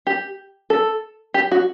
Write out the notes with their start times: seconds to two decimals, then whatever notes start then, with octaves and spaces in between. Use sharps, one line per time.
0.07 G4
0.70 A4
1.34 G4
1.51 F#4